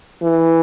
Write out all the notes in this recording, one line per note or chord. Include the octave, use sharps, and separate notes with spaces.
E3